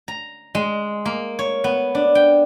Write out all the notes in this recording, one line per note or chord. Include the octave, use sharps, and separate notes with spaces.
A#5
G#3
A#3
C#5
B3
D4
G5